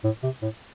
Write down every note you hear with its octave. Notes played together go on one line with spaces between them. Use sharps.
A2
C3
A2